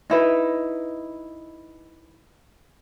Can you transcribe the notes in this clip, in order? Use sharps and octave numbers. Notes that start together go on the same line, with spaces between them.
D#4 E4 B4